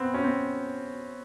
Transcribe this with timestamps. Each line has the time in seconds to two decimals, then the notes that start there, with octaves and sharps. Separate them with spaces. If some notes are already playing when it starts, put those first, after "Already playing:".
Already playing: B3 C4
0.14 C#4
0.24 C4